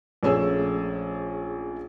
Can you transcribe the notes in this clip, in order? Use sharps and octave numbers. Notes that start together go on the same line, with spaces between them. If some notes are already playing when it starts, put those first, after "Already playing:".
A#1 A3 C#4 G#4 E6